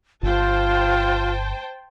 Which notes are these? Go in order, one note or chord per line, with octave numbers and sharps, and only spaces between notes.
G1 F4 C5 G5 A5